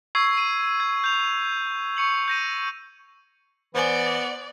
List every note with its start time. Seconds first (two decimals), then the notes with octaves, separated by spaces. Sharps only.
0.15 C#6 E6 G#6 C7
0.37 D#7
0.80 G#6
1.04 G6 F7
1.97 C#6 C#7 F#7
2.28 G6 A#6 D#7
3.75 E3 B3 C5 D5 G#5 G7